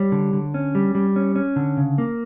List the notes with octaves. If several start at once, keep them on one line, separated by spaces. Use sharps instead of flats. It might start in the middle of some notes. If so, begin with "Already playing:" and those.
Already playing: G3 C#5
D3
D3
C#4
G3
G3
C#4
C#4
D3
C#3
A#3